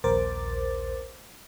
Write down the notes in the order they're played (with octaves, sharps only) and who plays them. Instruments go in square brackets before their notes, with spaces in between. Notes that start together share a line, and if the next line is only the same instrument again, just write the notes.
[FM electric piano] A#1 D#2 A#4 C5 D6 A6